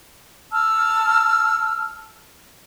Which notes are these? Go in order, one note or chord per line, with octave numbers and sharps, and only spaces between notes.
A5 E6 F6